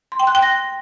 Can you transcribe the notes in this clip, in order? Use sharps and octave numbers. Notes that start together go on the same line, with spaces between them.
C6
G5
F#6
G5
A#6